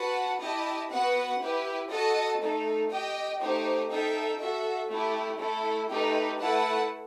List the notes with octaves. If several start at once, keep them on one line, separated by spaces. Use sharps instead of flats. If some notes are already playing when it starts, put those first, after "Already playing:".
Already playing: F#4 B4 F#5 A5
E4 G4 D#5 A5
B3 F#4 B4 F#5
E4 G4 B4
F#4 A4 D#5 A5
A3 D#4 A4
G4 D#5 G5
A3 D#4 G4 C5
D#4 A4 E5 G5
F#4 A4 E5
A3 E4 G4
A3 E4 A4
A3 D#4 G4 B4
A3 E4 B4 F#5 A5